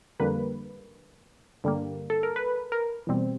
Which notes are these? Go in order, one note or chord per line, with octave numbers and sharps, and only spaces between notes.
F2 D3 G3 A#3 B4
G2 D3 G3 A#3
A4
A#4
B4
A#4
E2 B2 G3 C4